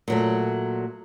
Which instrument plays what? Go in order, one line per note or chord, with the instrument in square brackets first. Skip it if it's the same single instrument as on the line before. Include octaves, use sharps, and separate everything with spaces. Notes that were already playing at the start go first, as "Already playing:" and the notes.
[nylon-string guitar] A#2 F#3 A3